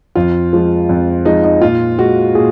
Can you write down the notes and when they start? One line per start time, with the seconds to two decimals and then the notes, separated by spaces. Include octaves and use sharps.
0.15 F2 F4
0.53 F3 G#3
0.89 F2
1.25 F3 G#3 D#4
1.44 D#4
1.61 A#2 F4
1.99 G#3 F#4
2.35 A#2 G#4